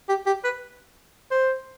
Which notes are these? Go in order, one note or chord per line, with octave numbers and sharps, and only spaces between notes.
G4
G4
B4
C5